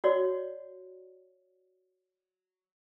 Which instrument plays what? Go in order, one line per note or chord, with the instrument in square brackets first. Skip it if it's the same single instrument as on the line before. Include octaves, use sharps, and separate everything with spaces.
[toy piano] F#4 C#5 D5